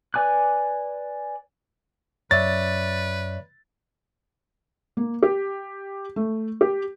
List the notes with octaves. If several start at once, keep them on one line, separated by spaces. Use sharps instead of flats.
B4 D5 G#5 D6 F#6
F#2 B4 C#5 D5 E5 A6
A#3
G4
A3
G4